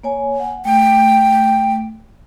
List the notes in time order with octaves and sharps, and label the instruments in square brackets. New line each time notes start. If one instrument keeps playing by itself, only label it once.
[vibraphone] A#3 C#5 G#5
F#5
[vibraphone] A3 [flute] G5